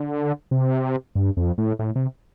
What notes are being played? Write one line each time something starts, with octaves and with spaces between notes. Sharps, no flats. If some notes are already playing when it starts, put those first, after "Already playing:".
Already playing: D3
C3
G2
F2
A2
A2
C3